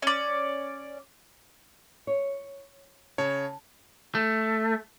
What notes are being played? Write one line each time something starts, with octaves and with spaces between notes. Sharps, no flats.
C#4 D5
C#5
C#3 C#5 A5
A3